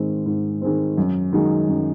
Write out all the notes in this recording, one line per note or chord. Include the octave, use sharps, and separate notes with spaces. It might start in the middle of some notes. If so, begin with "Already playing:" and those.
Already playing: G#2 D#3 G#3 C4
G#2
D#3 G#3 C4
F#2
D#3 G#3 D#4 F#4
F#2